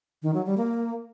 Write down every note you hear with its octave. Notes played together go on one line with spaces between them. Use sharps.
D#3
F#3
G3
A#3